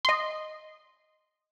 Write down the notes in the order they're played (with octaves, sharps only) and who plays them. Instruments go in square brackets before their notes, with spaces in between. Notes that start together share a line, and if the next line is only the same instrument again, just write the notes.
[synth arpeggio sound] D#5 C6